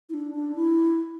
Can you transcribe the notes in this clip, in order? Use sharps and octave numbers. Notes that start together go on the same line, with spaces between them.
E4
D4
D4
E4